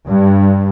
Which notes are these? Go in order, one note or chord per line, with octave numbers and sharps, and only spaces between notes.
G2